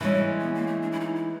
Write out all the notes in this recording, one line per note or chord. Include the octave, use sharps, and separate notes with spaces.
E3 G3 G#3 C#4
B3
A#3
A3
D4
E4
D#4
E4